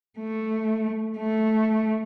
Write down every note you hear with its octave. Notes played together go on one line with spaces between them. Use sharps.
A3
A3